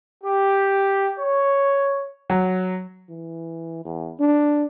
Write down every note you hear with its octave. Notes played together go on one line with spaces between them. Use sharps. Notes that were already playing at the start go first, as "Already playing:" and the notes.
G4
C#5
F#3
E3
E2
D4